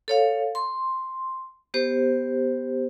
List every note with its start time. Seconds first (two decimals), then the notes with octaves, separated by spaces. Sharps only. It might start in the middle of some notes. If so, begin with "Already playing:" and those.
0.08 A4 C#5 F5
0.55 C6
1.74 B3 G4 C5